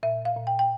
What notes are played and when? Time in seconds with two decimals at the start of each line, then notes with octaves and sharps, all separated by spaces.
0.03 A#2 E5
0.25 F5
0.36 A#2
0.47 G5
0.59 G5